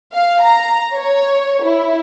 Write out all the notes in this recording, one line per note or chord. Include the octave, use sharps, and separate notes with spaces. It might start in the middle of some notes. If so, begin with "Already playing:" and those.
F5
A#5
C#5
E4